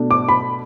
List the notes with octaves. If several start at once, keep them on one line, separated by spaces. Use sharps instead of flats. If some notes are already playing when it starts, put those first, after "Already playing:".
Already playing: B2 A3 D4
D6
B5